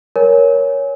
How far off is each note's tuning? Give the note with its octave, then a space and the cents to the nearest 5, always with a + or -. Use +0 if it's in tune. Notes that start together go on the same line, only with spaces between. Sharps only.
A#4 +15 C#5 +5 G#5 +0